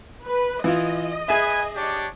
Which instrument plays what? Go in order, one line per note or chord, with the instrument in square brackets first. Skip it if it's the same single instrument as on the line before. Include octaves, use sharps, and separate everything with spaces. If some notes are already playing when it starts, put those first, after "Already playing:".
[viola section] B4
[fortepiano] E3 E4 F4 [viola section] D#5
[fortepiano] G#4 E5 [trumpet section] B4 G#5
[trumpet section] D4 G4 C#5